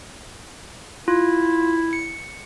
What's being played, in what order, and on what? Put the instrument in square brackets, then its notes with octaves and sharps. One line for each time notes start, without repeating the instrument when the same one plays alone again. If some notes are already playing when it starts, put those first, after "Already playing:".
[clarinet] E4 [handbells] F4
[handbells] C#7